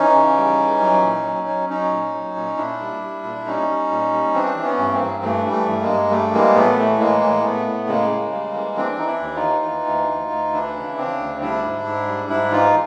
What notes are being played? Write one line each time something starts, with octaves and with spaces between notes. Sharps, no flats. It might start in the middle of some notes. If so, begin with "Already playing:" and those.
Already playing: E3 C#4 D#4
C#3
G3
E3
F#3
A#2
F#3
F#3
F#3 C#4 D#4
A#2
F#3
A#2
A#2 D4 E4
G3
G3
A#2
G3 C#4 D#4
G3
A#2
G3
E3 C4 D4
E3
B3 C#4
G2
A#3 C4
G2
E3 A3
G3
A3
G2
G#3 A#3
G2
G3 A3
E3 G#3 A#3
A2 A3 B3
E3 A3
A2 G#3 A#3
A2
A2 A3 B3
A2
C#3 G#3 A#3
C#3
G3
E3
E3 C4 D4
D4
E3 D#4
D4 E4
D#2
D#4 F4
E3
E3
D2
D2
D2
E3 D4 E4
C#3
C#3 C4 D4
D2
G3 D4 E4
G#2
G#2
G3
G#2 D4 E4
E3 D#4 F4